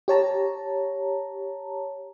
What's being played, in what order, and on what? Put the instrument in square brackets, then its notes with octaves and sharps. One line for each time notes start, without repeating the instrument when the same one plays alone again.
[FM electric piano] G4 C#5 A5 A#5